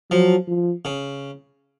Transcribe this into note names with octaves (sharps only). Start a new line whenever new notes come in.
F3 F#3
F3
C#3